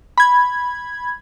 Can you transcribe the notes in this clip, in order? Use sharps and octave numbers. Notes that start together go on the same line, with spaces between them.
B5 G#6